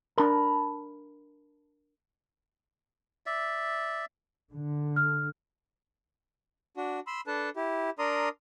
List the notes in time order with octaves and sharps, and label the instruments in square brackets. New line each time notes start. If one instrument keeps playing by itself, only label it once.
[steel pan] D4 A#4 [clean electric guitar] A5 B5
[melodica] D5 E5
[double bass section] D3
[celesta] F6
[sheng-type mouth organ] D4 F#4
B5 C6 E6
D4 A4 B4 A5
E4 G4
D4 A#4 D5 A#5 C6 D#6